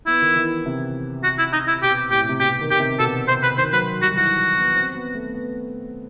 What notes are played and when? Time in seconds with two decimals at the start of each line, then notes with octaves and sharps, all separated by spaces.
0.07 B3 E4
0.21 D#3
0.36 E3
0.66 C3
1.24 F#4
1.39 E4
1.53 D#4
1.68 E4
1.83 B2 G4
2.11 A2 G4
2.29 C3
2.40 B2 G4
2.61 D#3
2.71 G4
2.80 C3
2.99 B2 A4
3.28 C3 C5
3.43 B4
3.58 D#3 C5
3.73 F#3 B4
4.02 G3 F#4
4.11 D#3
4.17 E3 F#4
4.56 B3
4.75 C4
4.95 B3
5.14 A3
5.34 B3